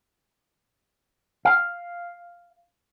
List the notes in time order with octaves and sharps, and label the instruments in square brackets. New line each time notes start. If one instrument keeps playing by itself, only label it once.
[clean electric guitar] F5